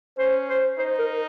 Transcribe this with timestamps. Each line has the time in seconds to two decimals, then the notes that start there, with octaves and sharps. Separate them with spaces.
0.18 C#4 C5
0.49 C5
0.78 D#4 C5
0.99 A#4